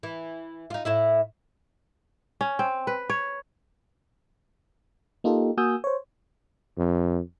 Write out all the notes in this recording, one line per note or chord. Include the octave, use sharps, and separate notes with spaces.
E3
D#4 F4
A2 E4 E5
C#4
C4
B4
C#5
A#3 D#4 F4 G4 A4
A#3 F#4 G#5 D#6 E6 G6
C5 C#5
F2